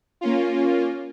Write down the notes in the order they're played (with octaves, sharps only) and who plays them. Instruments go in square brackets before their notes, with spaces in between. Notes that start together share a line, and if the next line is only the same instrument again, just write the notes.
[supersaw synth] A#3 C#4 F4